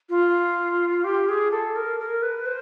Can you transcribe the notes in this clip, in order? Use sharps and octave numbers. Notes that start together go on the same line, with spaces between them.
F4
G4
G#4
A4
A#4
A#4
B4
C5